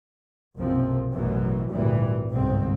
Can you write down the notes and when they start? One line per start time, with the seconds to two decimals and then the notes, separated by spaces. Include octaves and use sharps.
0.56 F#1 B1 C3 F3 C4
1.14 A1 F#2 B2 E3 F#3
1.71 G#1 D2 A#2 E3 G3
2.31 G1 C2 G#2 C4